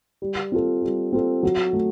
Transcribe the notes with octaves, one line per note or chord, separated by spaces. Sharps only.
G3
C4 F4 A4
G3
C4 F4 A4
F#3
A3